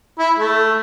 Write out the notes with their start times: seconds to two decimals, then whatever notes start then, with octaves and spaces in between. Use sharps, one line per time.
0.19 E4
0.38 A3